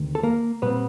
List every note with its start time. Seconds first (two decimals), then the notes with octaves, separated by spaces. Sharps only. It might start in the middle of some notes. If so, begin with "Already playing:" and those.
Already playing: D2 C3 D#3
0.15 A4
0.23 A#3 A#4
0.62 A#2 G3 B3 C4 B4